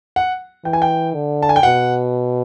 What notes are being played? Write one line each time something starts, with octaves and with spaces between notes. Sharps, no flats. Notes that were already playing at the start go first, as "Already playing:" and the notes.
F#5
E3 G5
G#5
G5
D3
A5
G#5
G5
B2 F#5